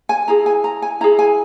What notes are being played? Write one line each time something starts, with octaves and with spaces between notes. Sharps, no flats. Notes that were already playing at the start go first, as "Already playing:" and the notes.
G#5
E4 G#4 A#5
G#5
A#5
G#5
E4 G#4 A#5
G#5